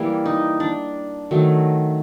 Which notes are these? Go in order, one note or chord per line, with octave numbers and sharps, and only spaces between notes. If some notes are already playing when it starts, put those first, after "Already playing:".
Already playing: E3 G3 A#3
D#4
D4
D#3 F#3 A3